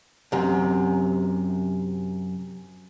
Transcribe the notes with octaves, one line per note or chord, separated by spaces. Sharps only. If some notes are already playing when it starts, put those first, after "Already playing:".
F#2 C3